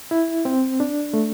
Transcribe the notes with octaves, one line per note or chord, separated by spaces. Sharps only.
E4
C4
D4
A3